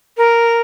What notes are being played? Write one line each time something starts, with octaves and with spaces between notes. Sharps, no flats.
A#4